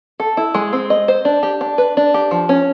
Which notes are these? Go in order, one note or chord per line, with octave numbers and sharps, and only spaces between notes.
A4
E4
G#3
C4
D#5
C5
D4
G4
D4
B4
D4
G4
F3
C#4